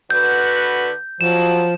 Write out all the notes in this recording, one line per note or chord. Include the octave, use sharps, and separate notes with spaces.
D3 F#4 B4 G6
F2 F3 F#3 E7